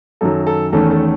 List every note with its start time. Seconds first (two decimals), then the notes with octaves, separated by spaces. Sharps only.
0.21 F#2 D#3 F#3 A4
0.47 A4
0.72 E2 D#3 A3 C#4 A4
0.91 A4